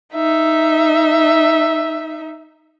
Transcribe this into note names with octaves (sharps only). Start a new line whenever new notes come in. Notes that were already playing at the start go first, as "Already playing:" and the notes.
D#4 E5